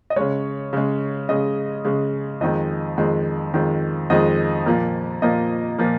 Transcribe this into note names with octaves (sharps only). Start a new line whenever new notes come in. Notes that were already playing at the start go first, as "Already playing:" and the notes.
D#5
C#3 G#3 C#5
C#3 G#3
C#3 G#3 D#5
C#3 G#3
F2 D#3 G#3 D#5
F2 D#3 G#3
F2 D#3 G#3
F2 D#3 G#3 D#5
A#2 F3 A#3
A#2 F3 A#3 D#5
A#2 F3 A#3